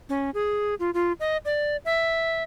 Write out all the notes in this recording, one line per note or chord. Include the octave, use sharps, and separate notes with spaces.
C#4
G#4
F4
F4
D#5
D5
E5